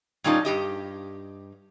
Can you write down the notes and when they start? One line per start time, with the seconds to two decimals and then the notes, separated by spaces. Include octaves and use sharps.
0.24 A#2 G3 C#4 D#4 F4 A5
0.45 G2 G4 D#5